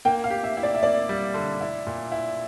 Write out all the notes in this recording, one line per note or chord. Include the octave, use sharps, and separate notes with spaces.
A#3 G5
F5
G4
E5
E4
D5
E5
A#3 D5
G3
D3
E4
A#2
E4